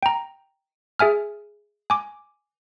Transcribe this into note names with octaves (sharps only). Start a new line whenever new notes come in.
G5 A#5
G#4 E5 G#5 F6
G#5 D6